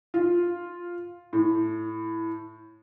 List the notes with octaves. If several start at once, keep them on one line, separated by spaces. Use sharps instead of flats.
F4
A2